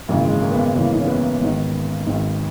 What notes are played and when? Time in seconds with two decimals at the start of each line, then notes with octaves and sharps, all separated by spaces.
0.08 G#1 F#2 C#3 E3 A#3
0.25 G#3
0.42 A#3
0.51 B3
0.58 A#3
0.75 G#1 F#2 C#3 E3 A#3
0.93 D#4
1.00 C#4
1.07 B3
1.40 G#1 G#2 D#3
2.06 G#1 G#2 D#3